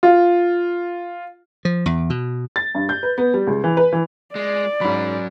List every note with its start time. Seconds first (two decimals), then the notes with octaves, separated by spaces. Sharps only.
0.03 F4
1.65 F3
1.86 E2
2.10 B2
2.56 A6
2.75 G2
2.89 G6
3.03 B4
3.18 B3
3.34 G3
3.47 C#2
3.64 E3
3.77 B4
3.93 E3
4.35 G#3 D5
4.81 G#2 F#3 C#4 B5